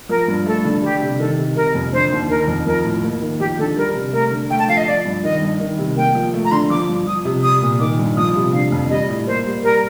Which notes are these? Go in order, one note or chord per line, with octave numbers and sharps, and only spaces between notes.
F3 A#4
G2
A3 A4
D3
G3 G4
C3
D#3 A4
C3
C3 A#4
F2
D3 C5
D#2
D#3 A#4
F2
F3 A#4
A2
A#3
D#3
F3 G4
D3 A4
G3 A#4
C3
A3 A#4
D3
A3 G5
A5
F3 F5
D#5
F3 D5
G2
D#3 D#5
G2
D#3
C3
A#3 G5
F3
A3
A#5
D3 C6
F3 D6
G2
F3 D#6
C3
G3 D#6
A#2
D#3 D6
G2
F3 D#6
C3
D3 F5
F2
G3 D#5
A2
A#3 C5
G3
G3 A#4